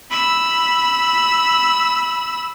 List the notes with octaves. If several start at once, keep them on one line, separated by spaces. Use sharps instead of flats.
B5 E6